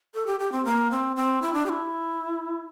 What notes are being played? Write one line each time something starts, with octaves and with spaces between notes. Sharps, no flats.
A4
G4
G4
C4
A#3
C4
C4
E4
D4
G4
E4